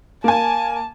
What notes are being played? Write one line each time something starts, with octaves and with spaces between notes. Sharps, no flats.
A#3 G#5 A5